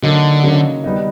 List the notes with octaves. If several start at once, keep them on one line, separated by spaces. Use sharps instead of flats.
D3 F#3 A#3 D#4
C#3 F#3 A#3 D#4
D#3 G3 B3 D#4